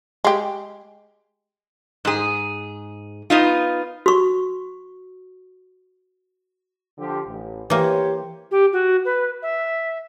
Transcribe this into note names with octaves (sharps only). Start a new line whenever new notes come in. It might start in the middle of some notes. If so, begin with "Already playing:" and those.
G#3 G4
G#2 G#4
B3 D#4 F4
F#4 C#6
D3 F3 G4
A1
E3 A#3 G4 C5 C#5
G4
F#4
B4
E5